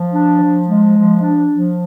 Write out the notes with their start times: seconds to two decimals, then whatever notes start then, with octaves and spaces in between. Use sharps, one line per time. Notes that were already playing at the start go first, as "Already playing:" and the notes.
Already playing: F3
0.13 D4
0.40 F3
0.68 G#3
0.95 F3
1.22 D4
1.50 F3